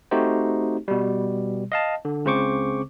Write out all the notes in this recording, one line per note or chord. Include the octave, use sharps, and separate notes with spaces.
A3 C4 D#4 F#4 G4 C5
B2 G3
D#5 F5 A5
D3
C#2 C#3 C4 C5 C#6 D6